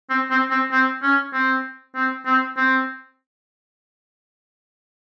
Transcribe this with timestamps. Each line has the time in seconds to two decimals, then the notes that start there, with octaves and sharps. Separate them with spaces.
0.10 C4
0.31 C4
0.51 C4
0.71 C4
1.03 C#4
1.33 C4
1.95 C4
2.26 C4
2.57 C4